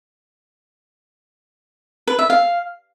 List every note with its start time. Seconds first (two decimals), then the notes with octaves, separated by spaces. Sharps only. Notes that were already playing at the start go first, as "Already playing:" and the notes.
2.07 B4
2.19 E5
2.30 F5